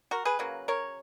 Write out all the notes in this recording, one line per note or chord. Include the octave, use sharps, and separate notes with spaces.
F#4 A#4
G#4 B4
C#3 F#3 A#3
A#4 C#5